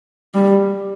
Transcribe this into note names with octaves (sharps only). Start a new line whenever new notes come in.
G3